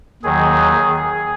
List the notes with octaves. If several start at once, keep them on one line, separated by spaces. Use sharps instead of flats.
D#2 D#3 F#3 G#4
G#4